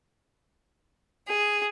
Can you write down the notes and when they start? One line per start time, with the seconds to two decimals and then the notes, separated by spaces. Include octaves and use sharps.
1.27 G#4